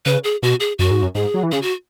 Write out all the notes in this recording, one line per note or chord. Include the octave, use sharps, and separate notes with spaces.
C#3 B4
G#4
B2 F#4
G#4
F#2 F#4
G#2
F#2
G#2 G#4
F#3
E3
C#3 G#4
F#4